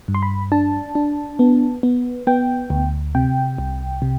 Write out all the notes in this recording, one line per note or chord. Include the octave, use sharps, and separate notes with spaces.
G2
C6
B5
D4 A5
D4
B3
B3
B3 G5
D2
C3 G5
C2
C3